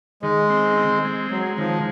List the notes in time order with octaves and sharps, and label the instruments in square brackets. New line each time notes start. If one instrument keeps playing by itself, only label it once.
[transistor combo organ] D#3 [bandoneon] G#3
[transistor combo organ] C4
C4
G#3
[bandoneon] F#3 [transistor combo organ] G#3
[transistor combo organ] D#3 [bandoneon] F3